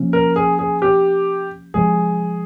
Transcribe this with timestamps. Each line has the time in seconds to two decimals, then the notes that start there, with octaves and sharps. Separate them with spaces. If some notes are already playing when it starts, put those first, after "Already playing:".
Already playing: C3 F3 A#3 C#4
0.13 A#4
0.36 G#4
0.59 G#4
0.82 G4
1.74 C3 F3 G#3 G#4